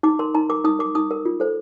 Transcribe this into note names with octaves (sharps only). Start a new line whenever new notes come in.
D#4 D6
A#4 C6
D#4 A#5
A#4 D6
D#4 D#6
A#4 D6
D#4 D#6
A#4
F4
A4 C5